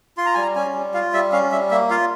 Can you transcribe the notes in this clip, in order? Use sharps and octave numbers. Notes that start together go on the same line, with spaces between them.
F4 C6
A#5
G3 G#5
A#5
C#4 G#5
G3
F4 F5
G3 E5
C#4 F5
G3 E5
A#3 E5
F4 F5